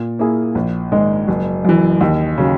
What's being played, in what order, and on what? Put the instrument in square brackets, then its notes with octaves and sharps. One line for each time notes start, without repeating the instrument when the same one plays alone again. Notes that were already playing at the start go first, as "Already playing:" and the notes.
Already playing: [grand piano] A#2
A#3 E4 G#4
A#1
G#2 D#3 G#3
F#1
F#2 E3
D#2
C#3 F#3